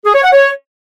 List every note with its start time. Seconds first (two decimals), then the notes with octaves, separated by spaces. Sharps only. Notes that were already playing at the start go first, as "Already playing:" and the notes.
0.06 G#4
0.15 C#5
0.24 F#5
0.33 C#5